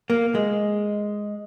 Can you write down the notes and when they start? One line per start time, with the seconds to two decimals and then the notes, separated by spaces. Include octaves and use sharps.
0.10 A#3
0.35 G#3